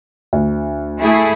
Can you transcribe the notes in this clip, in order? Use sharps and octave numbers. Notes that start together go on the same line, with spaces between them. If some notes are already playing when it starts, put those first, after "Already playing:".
D2
A3 E4 G#4